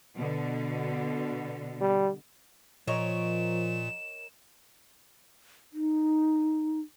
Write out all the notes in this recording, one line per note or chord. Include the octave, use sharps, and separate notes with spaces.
B2 D3
G3
A#2 F3 A#4 C#5 D#5 E7
D#4